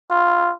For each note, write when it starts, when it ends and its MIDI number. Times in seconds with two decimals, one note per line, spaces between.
0.10 0.53 65